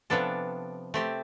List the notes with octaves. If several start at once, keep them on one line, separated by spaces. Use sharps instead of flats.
C3 F3 B3 D4 A4
A3 C4 G4